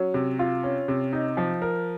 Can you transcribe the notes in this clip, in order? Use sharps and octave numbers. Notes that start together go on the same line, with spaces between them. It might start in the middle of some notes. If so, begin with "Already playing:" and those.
Already playing: F#3 C#4
C3
F4
C#4
C3
D#4
F3
A#4